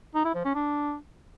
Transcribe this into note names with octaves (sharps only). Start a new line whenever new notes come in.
D#4
E4
F3
C#4
D4